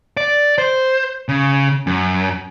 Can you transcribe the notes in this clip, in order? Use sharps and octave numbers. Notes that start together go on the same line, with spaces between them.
D5
C5
C#3
F#2